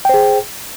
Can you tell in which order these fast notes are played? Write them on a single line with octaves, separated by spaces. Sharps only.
G5 C5 G#4